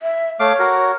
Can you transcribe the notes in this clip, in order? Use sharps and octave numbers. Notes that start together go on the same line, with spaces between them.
E5
A3 C#5 F5 D6
F#4 A#4